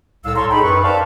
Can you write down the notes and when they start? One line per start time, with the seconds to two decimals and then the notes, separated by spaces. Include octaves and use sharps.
0.24 C2 A2 A4 F5 E6
0.36 A4 C#5 A5 A#5 C6
0.51 D#4 G#4 A4 G5 B5
0.62 F#2 B4 C#6
0.83 B4 C5 D5 F5 G5 A5